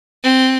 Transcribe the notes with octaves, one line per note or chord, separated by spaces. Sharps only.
C4